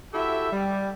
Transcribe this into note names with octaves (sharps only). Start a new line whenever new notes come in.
E4 F#4 G4 A4 E5
G3